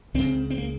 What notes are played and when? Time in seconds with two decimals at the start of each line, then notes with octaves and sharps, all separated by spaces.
0.14 C#2 C#3 C4
0.50 C4
0.58 A#3